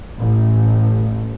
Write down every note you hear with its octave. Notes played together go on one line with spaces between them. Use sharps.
A1